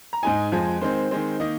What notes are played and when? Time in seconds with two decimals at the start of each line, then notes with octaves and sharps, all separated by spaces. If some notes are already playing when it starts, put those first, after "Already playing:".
0.13 A#5
0.23 G#2 G#3 D#4 G#5
0.52 F2 F3 G#3
0.81 D#3 G#3 C4 C5
1.11 D#3 G#3 C4
1.40 D#3 A#3 D#4 D#5